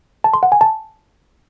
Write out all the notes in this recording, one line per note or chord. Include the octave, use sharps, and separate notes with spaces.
A5
C6
F#5
G#5
A5